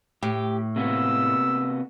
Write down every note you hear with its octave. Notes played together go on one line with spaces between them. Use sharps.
A2 G4
C3 A#3 B3 E6